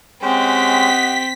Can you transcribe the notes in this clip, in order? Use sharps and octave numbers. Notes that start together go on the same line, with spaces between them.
G#3 C4 C#4 G4 D#5 F#5 B6